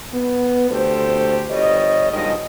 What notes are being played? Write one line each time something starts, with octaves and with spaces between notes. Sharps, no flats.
B3
D2 G4 A4 C5
G1 G3 C#5 D#5
G2 B2 D#3 F3 G#3 D#5